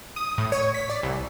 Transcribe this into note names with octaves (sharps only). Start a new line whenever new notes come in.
D#6
A2
C#5
B6
D5
C2